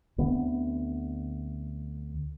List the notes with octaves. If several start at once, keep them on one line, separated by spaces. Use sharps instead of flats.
D2 D3 B3 C4